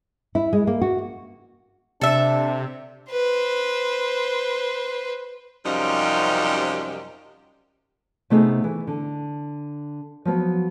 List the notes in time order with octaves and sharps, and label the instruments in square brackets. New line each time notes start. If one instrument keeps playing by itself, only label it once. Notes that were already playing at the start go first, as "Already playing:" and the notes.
[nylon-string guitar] E4
G#3
A#3
F#4
[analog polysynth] C3 [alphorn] D4 [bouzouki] A4 E5
[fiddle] B4 C5
[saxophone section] F#2 C3 F3 G3 C#4 D#4
[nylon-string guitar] C3 A3 B3 D#4 G#4 A4
E3
D3
F3 F#3 B3